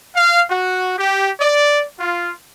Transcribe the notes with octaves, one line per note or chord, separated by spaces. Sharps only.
F5
F#4
G4
D5
F4